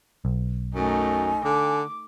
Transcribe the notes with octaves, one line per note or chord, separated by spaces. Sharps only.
B1
F#2 A3 D#4 G#5
D3 D6